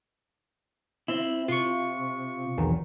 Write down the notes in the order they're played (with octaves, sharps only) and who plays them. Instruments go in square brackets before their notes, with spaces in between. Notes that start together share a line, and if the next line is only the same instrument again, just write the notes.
[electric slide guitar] C4 E4
[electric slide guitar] C3 [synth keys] F4 C#6
[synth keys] B1 E2 D#3